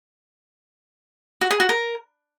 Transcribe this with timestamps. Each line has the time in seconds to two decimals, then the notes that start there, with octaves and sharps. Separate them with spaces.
1.41 F#4
1.51 G#4
1.60 F#4
1.69 A#4